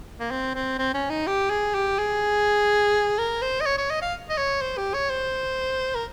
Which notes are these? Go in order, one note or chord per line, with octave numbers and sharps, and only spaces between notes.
A#3
C4
C4
C4
C#4
D#4
G4
G#4
G4
G#4
A#4
C5
D#5
C#5
C#5
D#5
F5
D#5
C#5
C5
G4
C#5
C5
A#4